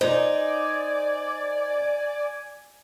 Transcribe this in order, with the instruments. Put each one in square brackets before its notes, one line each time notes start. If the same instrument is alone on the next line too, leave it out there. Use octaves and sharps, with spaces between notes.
[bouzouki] D#4 [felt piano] C5 [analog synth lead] D5 [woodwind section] G#5